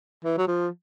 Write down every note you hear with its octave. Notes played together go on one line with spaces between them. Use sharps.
E3
F#3
F3